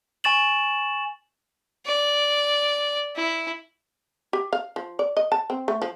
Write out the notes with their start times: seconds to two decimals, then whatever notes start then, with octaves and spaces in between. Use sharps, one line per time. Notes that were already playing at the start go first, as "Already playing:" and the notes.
0.24 G#5 C#6 A6 E7 F#7
1.86 D5
3.15 E4
4.33 G4
4.53 F5
4.76 F3
4.99 D5
5.17 D#5
5.32 A5
5.50 C4
5.68 A3
5.82 F3